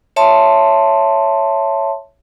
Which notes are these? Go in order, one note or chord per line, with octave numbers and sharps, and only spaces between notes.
C#5 E5 A5 C6